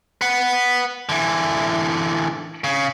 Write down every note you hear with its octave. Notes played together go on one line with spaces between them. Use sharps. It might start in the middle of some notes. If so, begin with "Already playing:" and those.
B4 F#5
D3 E3
C#3